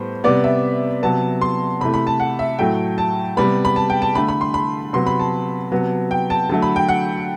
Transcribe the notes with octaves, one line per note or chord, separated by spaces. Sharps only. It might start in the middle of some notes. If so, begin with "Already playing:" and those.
Already playing: A2 G3 B3 C5
C3 G3 B3 D5
E5
C3 F#3 B3 A5
C6
C3 E3 A3 B5
B5
A5
F#5
E5
A2 F#3 A3 G5
A5
C3 G3 B3 B5
B5
A5
G5
A5
D3 A3 B5
B5
C6
B5
C3 F#3 B3 C6
B5
A5
C3 F#3 B3
G5
A5
D3 F#3 A3 A5
B5
G5
F#5